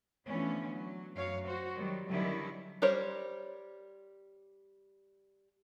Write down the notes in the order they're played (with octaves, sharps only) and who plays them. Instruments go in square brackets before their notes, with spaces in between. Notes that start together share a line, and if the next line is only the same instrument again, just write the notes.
[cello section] D3 E3 F3 A3 B3 C#4
F#3
F#2 F#3 C#5 F5
F#4 C5
D#3 F#3 G3
D3 D#3 F#3 G3 C#4 E4
[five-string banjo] G3 A#4 C5 C#5